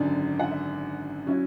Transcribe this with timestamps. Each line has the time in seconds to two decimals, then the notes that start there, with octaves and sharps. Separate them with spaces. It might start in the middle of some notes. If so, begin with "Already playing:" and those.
Already playing: G#1 F#2 D3 D5
0.40 F#5
0.50 E5
1.26 F#3 C#4 E4